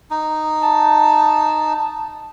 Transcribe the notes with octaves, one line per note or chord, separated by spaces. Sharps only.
D#4
A5